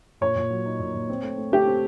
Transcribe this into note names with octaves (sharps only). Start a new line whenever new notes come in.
A#2 C#5
A#2
F#3
D#4
A#2
A#2
C4
A3
A3
A3 G4
C4